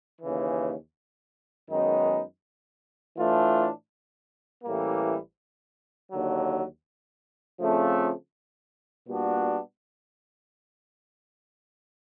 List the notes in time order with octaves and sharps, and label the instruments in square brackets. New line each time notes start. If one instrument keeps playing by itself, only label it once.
[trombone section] D#2 C#3 E3
F#2 D#3 G#3 B3 D#4
A2 E3 A3 D4 F4
A1 A2 E3 G3 A#3
D#2 D3 F#3
C#3 F3 A3 C4
A#2 G3 B3 D4 F#4